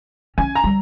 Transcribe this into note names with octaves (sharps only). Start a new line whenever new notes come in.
C#4 G#5
A#5
G3